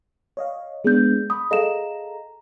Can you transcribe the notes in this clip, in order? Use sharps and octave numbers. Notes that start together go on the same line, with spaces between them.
C#5 D#5 F5
G#3 B3 D4 G#4 G6
B5 D#6
G#4 A4 D#5 F5 A#5 E7